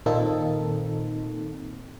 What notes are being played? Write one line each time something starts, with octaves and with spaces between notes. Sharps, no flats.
A#2 D#3 A#3 C4 D#4 A4